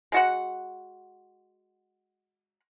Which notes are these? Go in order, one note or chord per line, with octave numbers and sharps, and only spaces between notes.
G#3 F#4 F#5